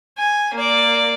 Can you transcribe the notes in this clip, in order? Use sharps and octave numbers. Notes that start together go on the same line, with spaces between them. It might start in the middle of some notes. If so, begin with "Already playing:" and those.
G#5
A#3 D5